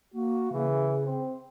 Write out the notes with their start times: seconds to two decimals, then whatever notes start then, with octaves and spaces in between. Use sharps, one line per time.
0.14 A#3 F#4
0.52 C#3 E3
1.05 C4